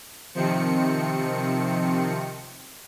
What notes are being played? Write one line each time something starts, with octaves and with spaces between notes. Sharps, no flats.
C3 D#3 F3 C4 C#7